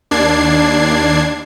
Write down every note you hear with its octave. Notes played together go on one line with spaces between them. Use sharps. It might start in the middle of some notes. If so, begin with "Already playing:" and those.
D#2 D4 G#6 C7